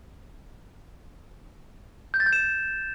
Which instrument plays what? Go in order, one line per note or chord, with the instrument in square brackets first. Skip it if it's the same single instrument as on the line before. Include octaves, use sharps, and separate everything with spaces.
[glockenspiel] G6
A6
G6
E7